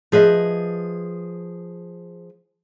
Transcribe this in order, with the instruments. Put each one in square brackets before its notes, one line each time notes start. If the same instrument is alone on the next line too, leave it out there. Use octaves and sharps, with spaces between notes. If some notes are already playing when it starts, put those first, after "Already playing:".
[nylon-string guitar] F3 G#4 B4 D#5 E5